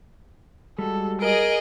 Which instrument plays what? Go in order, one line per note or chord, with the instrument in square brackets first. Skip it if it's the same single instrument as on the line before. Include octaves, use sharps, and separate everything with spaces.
[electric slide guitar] G3 G#3 F#4 [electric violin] A4
[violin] G#4 D#5 [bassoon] A#4 [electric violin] D7